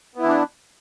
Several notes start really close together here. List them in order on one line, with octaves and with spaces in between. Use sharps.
B3 E4 E3 D4